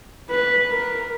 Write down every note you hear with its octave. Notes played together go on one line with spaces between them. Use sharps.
B4
A#4